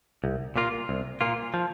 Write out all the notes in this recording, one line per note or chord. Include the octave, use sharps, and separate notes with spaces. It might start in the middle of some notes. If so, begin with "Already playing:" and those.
C2
A#2 A#3 F4
C2
A#2 A#3 F4
F3